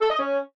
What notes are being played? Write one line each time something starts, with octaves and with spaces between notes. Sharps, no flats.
A4
D#5
C#4